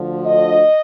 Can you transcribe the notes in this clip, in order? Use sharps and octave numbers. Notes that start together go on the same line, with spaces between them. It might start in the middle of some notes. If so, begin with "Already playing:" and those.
Already playing: D2 D3 F3
D#5